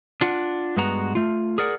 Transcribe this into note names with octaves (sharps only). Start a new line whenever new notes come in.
D4 F4 F#5
G2 G#3 B3 F#4 A#5
A3 F4
G#4 A#4 D5 F#5